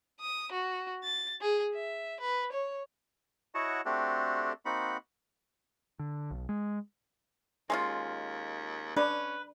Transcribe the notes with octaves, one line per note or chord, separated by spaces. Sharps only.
D#6
F#4
A6
G#4
E5
B4
C#5
E4 F#4 C#5 D#5 F#5 A5
A3 C4 D4 F#4 G4 A4
A#3 C4 D#4 F#4 F#5 B5
D3
B1
G#3
D#2 G#3 C#4 F4
C#4 D4 B4 D5